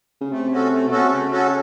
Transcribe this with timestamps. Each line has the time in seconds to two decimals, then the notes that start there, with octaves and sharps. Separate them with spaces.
0.21 C#3
0.31 C3 A3
0.52 C#4 F#4 A4
0.71 A3
0.85 B2
0.91 C#4 F#4 A4
0.99 C3
1.11 C#3 A3
1.31 C#4 F#4 A4